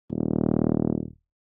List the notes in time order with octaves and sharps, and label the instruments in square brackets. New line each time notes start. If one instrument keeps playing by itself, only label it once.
[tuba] D#1